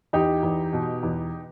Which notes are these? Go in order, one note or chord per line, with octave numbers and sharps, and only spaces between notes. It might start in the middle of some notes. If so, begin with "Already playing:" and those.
E2 D#4 G4
E2
B2
E2